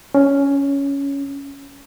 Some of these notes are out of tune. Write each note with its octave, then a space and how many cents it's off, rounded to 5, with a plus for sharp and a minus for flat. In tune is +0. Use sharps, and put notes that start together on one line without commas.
C#4 +10